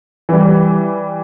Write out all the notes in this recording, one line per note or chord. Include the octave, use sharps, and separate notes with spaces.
E3 G3